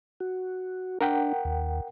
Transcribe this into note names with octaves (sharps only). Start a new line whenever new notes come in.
F#4
D4 A#4 F#5 G5
D#2